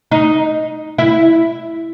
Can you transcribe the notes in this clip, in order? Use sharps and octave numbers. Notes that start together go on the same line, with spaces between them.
D#4
E4